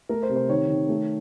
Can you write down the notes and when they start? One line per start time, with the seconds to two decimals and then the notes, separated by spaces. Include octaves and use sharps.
0.09 A3 A#4
0.23 C5
0.29 C3
0.36 C5
0.49 D#3 C#5
0.69 D#3
0.89 A3